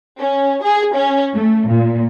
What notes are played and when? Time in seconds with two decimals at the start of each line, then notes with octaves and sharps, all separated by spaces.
0.19 C#4
0.63 G#4
0.95 C#4
1.34 A3
1.69 A#2